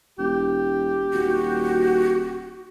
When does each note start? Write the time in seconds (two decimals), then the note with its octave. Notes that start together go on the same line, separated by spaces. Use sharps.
0.19 E1 G4
1.13 D#1 F#4